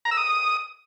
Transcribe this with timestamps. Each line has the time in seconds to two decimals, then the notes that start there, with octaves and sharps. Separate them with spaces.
0.05 A#5
0.11 E6
0.17 D#6